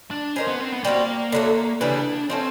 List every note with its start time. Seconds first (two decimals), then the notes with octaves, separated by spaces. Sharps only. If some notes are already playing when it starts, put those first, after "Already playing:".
0.11 D4
0.36 A#3 C#4 D#4 G#4 C5
0.48 B3
0.60 C4
0.72 B3
0.84 G3 A#3 C4 D#4 F#4
1.32 D3 F#3 A3
1.81 C#3 E3 G3 B3 D4
2.30 F3 A3 C4 C#4